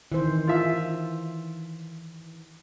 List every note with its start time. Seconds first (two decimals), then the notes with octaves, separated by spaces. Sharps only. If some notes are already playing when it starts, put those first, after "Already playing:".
0.12 D#3 E3 C5
0.47 F4 E5